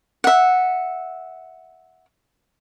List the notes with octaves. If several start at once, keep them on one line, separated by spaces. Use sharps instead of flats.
E5 F#5